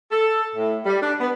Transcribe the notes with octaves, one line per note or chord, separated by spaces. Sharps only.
A4
A2
G3
D4
B3